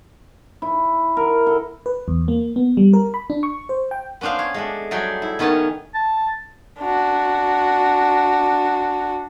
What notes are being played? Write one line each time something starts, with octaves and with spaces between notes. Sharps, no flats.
E4
A#4
A4
B4
E2
A#3
B3
G3
A#4
B5
D4
C#6
C5
G5
B3 C#4 D4 C5 F5
C#5
G#3 A3 D4
F#3 G3 A3 G#4 G5
E4
D#3 B3 C#4 C#5 A5
A5
D4 F#4